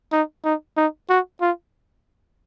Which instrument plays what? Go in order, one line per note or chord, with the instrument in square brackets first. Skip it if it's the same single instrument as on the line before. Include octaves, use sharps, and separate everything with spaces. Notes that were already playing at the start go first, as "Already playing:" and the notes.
[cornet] D#4
D#4
D#4
F#4
F4